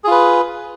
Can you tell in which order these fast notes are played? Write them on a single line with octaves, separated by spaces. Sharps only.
G#4 F4 B4